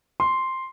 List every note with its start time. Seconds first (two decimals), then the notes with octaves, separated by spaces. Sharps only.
0.20 C6